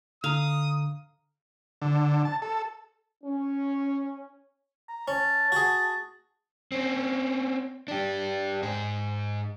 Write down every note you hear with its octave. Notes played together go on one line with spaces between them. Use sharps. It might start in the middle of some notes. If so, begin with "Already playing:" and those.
D3 F5 A#5 D#6
D3
A5
A4
C#4
A#5
C#4 A5
F#4 G#4
C4 C#4
D4 G4
G#2 G#4